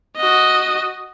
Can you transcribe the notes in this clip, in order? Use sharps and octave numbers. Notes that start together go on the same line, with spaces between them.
F#4 D#5